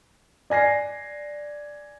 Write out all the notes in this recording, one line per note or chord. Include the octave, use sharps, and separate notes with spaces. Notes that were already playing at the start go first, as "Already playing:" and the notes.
D5 G#5 A#6 C7